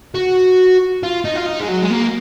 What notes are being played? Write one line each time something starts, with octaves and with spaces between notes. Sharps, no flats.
F#4
F4
D#4
F4
D#4
G#3
F#3
G#3
A#3